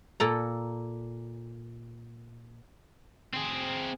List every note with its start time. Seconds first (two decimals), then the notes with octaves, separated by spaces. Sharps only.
0.20 A#2 A4 A#5
3.33 C4 G#4